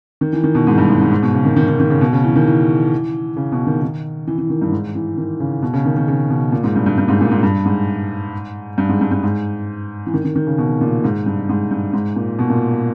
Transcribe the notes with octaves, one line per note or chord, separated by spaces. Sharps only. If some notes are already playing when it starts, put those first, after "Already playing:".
D#3
E3
D#3
B2
G#2
G2
G#2
G#2
G#2
B2
C#3
D#3
D#3
D#3
D#3
C#3
B2
C#3
E3
D#3
E3
C#3
B2
D#3
D#3
E3
E3
D#3
G2
G#2
E3
D#3
C#3
B2
C#3
D#3
D#3
C#3
B2
A#2
G#2
G2
G2
G2
G#2
A#2
G#2
G2
G#2
G2
G#2
G2
G2
G#2
E3
D#3
D#3
D#3
C#3
B2
A#2
G#2
G2
G#2
G2
G#2
A#2
B2
A#2